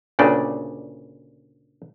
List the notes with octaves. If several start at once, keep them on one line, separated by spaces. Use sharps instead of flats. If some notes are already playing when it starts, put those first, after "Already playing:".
D2 A#2 C#3 D4 D5 G5